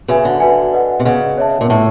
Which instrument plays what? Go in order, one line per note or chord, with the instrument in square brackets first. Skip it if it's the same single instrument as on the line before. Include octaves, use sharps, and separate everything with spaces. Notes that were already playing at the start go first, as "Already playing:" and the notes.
[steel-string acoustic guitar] C#3 [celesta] F#4 B4 E5 G#5
[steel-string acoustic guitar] D3
[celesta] F#4 B4 E5 G#5
B4 D#5 F#5
[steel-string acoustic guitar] C3
[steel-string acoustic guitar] C#3 [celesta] B4 D#5 F#5
[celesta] C#5 E5 A5
[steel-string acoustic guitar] A#2
[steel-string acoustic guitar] A2 [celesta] C#5 E5 A5